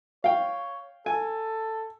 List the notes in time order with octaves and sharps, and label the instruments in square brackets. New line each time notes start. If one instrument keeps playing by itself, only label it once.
[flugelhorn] C#5 [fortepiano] F5 G5
[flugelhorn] A4 [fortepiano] G#5